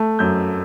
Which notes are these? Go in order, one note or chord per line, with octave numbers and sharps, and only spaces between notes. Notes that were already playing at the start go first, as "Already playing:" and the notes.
Already playing: A3
F#2 G6